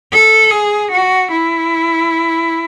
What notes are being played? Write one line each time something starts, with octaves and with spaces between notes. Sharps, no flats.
A4
G#4
F#4
E4